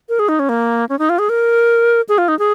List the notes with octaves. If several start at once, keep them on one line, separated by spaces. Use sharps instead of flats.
A#4
G#4
D#4
C#4
A#3
C#4
D#4
F4
G#4
A#4
G#4
F4
D#4
G#4